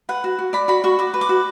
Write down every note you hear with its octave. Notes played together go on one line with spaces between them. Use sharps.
B4 F#5
F#4
F#4
D5 B5
F#4 B5
F#4 C#6
F#4 D6
B4
D6
F#4